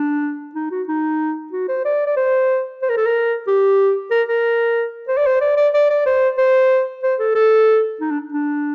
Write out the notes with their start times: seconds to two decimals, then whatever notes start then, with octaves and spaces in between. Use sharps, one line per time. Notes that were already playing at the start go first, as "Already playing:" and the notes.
Already playing: D4
0.55 D#4
0.71 F#4
0.88 D#4
1.53 F#4
1.69 C5
1.85 D5
2.07 D5
2.17 C5
2.83 C5
2.90 A#4
2.97 A4
3.06 A#4
3.47 G4
4.11 A#4
4.28 A#4
5.08 C5
5.18 D5
5.27 C5
5.42 D5
5.57 D5
5.74 D5
5.90 D5
6.06 C5
6.38 C5
7.03 C5
7.20 A4
7.35 A4
8.01 D#4
8.11 D4
8.33 D4